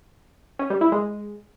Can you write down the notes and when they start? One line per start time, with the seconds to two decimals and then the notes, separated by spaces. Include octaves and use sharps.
0.59 C#4
0.70 G3
0.81 E4
0.92 G#3